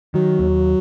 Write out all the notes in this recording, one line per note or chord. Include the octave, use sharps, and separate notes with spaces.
D#3 F#3
D#2